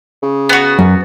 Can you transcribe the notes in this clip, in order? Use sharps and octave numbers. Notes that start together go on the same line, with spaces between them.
C#3
B3 F#4
F#2